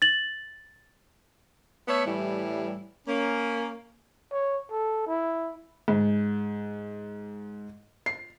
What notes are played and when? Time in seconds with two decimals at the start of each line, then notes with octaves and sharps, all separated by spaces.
0.02 A6 F#7
1.88 A3 B3 C#5 E5
2.04 A2 E3 G3
3.06 A#3 C#4
4.32 C#5
4.71 A4
5.06 E4
5.88 G#2
8.06 C7